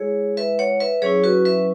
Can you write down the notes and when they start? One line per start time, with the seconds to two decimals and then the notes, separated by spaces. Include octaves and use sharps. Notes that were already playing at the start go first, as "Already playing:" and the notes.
Already playing: G#3 E4 G#4 C#5
0.37 B4 E5
0.59 C#5 F#5
0.80 B4 E5
1.02 F#3 C#4 E4 G#4 C#5
1.24 F#4 B4
1.45 B4 E5